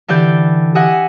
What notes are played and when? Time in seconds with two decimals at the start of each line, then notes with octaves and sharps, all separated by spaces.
0.08 D3 E3 G4 D5 G6
0.75 G4 D#5 E5 F#5 G#5